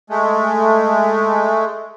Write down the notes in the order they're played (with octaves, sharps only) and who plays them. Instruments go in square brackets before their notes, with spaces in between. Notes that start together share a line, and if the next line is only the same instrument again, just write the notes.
[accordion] G#3 A3